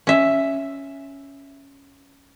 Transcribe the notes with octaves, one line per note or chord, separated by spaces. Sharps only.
C#4 E5